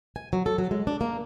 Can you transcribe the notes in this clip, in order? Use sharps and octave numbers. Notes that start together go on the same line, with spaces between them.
G#5
F#3
A4
F#3
G#3
D4
A#3